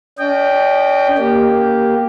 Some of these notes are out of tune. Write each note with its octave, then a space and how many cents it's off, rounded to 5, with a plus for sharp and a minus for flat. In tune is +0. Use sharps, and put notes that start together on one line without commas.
C#4 +40 D#5 -30 G5 +0
A#3 +0 G4 +0